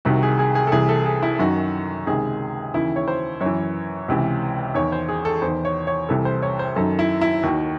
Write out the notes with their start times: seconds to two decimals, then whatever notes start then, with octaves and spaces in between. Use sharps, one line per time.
0.05 C2 C3 D#3 F#4
0.23 G#4
0.39 G#4
0.55 G#4
0.67 A4
0.72 C2 C3 E3 G#4
0.89 A4
1.06 G#4
1.23 E4
1.39 F#2 D#3 F#4
2.06 C#2 C3 D#3 G#4
2.74 D#2 C#3 E3 E4
2.96 C#5
3.08 C5
3.41 F#2 E3 C#5
4.08 C#2 C3 E3
4.74 E2 D#3 C#5
4.92 C5
5.08 G#4
5.25 A4
5.42 E2 D#3 C5
5.65 C#5
5.87 C#5
6.09 C2 C3 E3 A4
6.25 C5
6.42 C#5
6.59 C5
6.76 F#2 D#3 A4
6.99 E4
7.21 E4
7.43 D#2 D#3 F#4